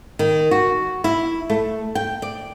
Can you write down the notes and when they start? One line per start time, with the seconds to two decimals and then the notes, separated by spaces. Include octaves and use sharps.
0.19 D#3
0.51 F#4
1.04 E4
1.50 A3
1.95 G5
2.22 D5